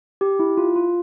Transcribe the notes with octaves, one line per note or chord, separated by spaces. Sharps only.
G4
E4
F4
F4